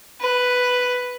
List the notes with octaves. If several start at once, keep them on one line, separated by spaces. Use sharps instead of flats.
B4